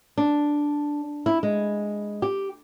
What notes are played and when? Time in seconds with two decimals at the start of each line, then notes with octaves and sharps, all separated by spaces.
0.17 D4
1.26 E4
1.43 G#3
2.22 G4